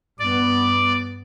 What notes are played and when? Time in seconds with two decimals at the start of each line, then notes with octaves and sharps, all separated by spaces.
0.19 G2 B3 D5